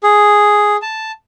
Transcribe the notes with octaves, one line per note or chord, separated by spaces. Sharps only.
G#4
A5